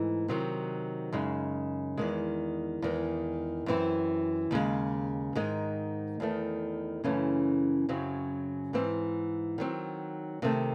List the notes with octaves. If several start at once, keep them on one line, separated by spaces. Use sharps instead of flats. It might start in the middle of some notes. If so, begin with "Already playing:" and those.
Already playing: G#2 E3 A3 D#4
C3 D#3 F#3 C4
F#2 C#3 G#3 D#4
E2 D#3 G#3
E2 D#3 G#3
F#2 E3 C4 E4
D#2 C#3 G#3
G#2 D#3 G#3 D#4
E2 D#3 A3
F#2 C#3 E3 A3 C#4
F#2 C#3 F#3 C4
G#2 E3 C4
D#3 F#3 C4
C3 D#3 A3 C4